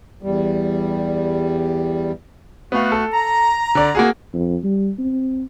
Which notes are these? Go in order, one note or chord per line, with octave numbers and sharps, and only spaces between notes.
E2 G3
A3 B3 F#4 F5
A4
A#5
D3 D5
A#3 F#4 G#4
F2
G3
C4